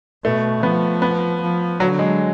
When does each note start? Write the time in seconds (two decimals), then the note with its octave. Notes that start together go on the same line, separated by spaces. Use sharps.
0.24 B2 A3
0.63 F3 B3
1.02 B3
1.41 F3
1.80 D3 F#3
1.99 G#3